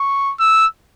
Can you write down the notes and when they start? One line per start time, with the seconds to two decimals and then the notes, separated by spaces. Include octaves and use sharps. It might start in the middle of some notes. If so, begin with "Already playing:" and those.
Already playing: C#6
0.40 E6